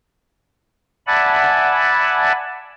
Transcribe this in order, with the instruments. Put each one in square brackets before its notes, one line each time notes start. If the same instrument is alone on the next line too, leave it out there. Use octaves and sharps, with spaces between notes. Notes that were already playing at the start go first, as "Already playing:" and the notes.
[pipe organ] D5 E5 F#5 G#5 A5 B5